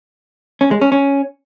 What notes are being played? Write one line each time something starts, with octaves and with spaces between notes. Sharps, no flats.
C#4
G#3
C#4
C#4